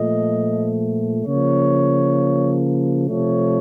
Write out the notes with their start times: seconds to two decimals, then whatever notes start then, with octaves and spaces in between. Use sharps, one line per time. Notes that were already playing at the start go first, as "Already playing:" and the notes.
Already playing: A#2 F3 A3 D#5
1.26 C#3 F3 A#3 C#5
3.08 C3 F3 A3 C#5